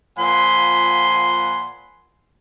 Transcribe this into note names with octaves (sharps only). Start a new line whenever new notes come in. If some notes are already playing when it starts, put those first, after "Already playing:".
A#2 F3 F#5 G#5 B5 C6